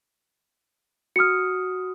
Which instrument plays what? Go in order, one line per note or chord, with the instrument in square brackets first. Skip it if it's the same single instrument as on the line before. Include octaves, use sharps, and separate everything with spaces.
[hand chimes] F#4 D#6 [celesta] F6 C#7